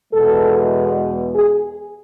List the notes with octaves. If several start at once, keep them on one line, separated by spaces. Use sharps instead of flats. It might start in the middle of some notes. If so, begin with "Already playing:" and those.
E2 B2 G#3 A4
G#4